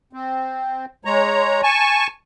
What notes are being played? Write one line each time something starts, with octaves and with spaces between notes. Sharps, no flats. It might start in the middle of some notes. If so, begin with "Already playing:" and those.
C4
G#3 C#5 A#5
G#5 A5 C#6